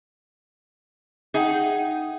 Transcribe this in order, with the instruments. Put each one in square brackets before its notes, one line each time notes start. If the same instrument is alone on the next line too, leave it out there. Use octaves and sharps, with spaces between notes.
[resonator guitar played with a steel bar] D#4 G#4 [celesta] E5 F#5 G5